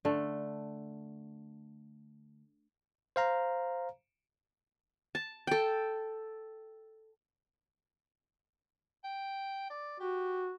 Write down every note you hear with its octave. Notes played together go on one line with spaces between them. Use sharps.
D3 A3
C5 F5 A#5
A5
A4 G5
G5
D5
F#4 G4